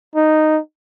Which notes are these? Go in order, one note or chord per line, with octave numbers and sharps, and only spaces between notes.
D#4